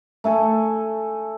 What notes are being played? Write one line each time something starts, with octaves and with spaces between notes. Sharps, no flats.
A3 A4 G#5